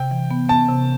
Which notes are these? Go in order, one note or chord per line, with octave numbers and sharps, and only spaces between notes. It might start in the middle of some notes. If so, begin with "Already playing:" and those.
Already playing: C3 G5
E3
B3
B3 A5
C3